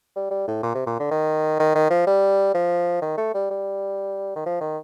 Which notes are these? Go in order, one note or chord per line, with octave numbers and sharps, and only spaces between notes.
G3
G3
A2
A#2
C3
A#2
D3
D#3
D#3
D#3
F3
G3
F3
D#3
A3
G3
G3
D#3
F3
D#3